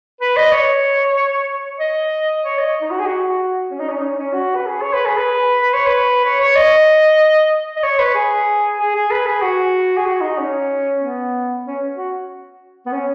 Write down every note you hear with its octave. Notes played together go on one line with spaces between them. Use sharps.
B4
D#5
C#5
D#5
C#5
D#5
D#4
F#4
G#4
F#4
C#4
D#4
C#4
D#4
C#4
C#4
F#4
B4
G#4
C#5
B4
G#4
B4
B4
C#5
B4
C#5
C#5
D#5
D#5
C#5
B4
G#4
G#4
G#4
B4
G#4
F#4
G#4
F#4
D#4
C#4
B3
C#4
F#4
B3
C#4